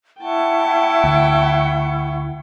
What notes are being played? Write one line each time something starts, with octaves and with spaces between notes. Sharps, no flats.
E4 F#5 G5 A5 C#6
D2